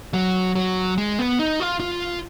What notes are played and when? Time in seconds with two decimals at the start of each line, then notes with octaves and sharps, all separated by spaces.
0.13 F#3
0.55 F#3
0.98 G#3
1.19 B3
1.39 D#4
1.60 F4
1.80 F4